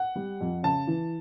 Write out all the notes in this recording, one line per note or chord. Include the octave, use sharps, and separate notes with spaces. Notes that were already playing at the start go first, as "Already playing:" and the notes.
Already playing: F#5
G3
F2
C#3 A5
E3